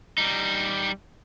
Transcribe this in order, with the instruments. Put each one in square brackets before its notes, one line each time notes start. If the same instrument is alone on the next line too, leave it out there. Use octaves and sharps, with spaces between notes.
[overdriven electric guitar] G3 D#4